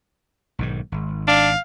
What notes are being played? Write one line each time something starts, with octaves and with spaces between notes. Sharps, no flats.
B1 G#2 D#3
G#1
D4 F5